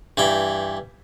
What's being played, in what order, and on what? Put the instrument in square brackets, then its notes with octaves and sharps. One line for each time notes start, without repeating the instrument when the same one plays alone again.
[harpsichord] G2 E3 G5